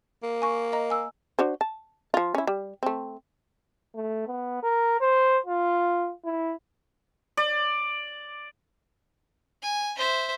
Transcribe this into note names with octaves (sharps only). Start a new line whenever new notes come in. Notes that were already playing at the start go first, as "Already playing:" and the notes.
A#3
G#5 C#6
D#5 A#5
G#5 E6
D4 F#4 C5
A5
F3 F4
C#4 E4
G3
A3 C4
A3
B3
A#4
C5
F4
E4
D5
G#5
C5 E5